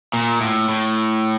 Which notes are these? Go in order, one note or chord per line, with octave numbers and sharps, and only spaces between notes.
A#2
A2
A2